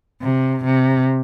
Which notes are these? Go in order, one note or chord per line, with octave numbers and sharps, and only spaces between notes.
C3
C3